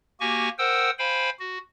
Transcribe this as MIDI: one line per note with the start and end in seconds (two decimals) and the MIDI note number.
0.20 0.49 58
0.20 0.49 66
0.20 0.49 67
0.20 0.49 80
0.20 0.49 85
0.59 0.90 70
0.59 0.90 72
0.59 0.90 78
0.59 0.90 79
0.59 0.90 87
0.59 0.90 88
0.99 1.30 72
0.99 1.30 77
0.99 1.30 79
0.99 1.30 80
0.99 1.30 83
1.40 1.58 66